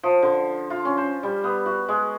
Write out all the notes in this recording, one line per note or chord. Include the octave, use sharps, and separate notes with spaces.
F3
D3
F4
C#4
C5
G3
B3
F#4
G#3